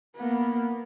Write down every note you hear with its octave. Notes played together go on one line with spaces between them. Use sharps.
A#3 B3